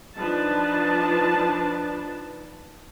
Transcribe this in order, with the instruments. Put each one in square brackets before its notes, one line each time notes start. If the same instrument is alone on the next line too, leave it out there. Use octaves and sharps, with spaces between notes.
[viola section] F3 D4 D#4 B4 A5